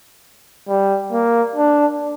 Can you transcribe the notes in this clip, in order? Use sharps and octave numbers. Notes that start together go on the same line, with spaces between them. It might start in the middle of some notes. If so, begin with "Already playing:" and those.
G3
A#3
D4